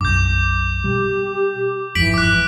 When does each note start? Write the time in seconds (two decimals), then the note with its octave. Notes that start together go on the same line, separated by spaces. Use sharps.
0.01 B1 F#2 D6 G6
0.84 B2 G3 G4
1.95 G1 F2 G#2 E3 B6 D7 F#7
2.14 D6 F#6